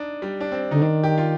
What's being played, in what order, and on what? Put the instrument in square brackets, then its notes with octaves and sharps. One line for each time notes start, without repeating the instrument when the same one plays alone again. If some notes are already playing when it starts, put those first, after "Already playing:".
Already playing: [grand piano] D4 D#4
G3
D4
C4
[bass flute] D3 [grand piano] D#4
[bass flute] D#3 [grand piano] D4
[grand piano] G4
F4